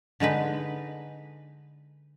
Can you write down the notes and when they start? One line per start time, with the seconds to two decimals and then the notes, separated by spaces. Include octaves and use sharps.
0.20 D3 G#3 D#4 B4